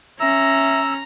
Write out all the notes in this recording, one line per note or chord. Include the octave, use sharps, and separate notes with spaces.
C#4 E5 A#5 E6